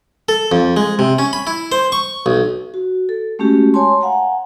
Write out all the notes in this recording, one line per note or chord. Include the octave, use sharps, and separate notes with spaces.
A4
F2
G#3
C3
C#4
B5
E4
C5
C#6
B1
F#4
A4
G#3 A3 C#4 F#4 G4
C#5 G#5 A5 C6
F5 F#5 G#5 A#5